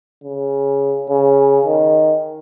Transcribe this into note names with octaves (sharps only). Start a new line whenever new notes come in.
C#3
C#3
D#3